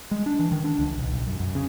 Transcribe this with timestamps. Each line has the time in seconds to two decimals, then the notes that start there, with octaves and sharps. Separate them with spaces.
0.11 G#3
0.26 D4
0.39 E3
0.52 D#3
0.64 D4
0.79 C#2
0.98 B1
1.12 B1
1.27 F#2
1.40 F#2
1.55 C#3